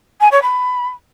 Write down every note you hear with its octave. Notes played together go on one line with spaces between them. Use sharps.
G#5
C#5
B5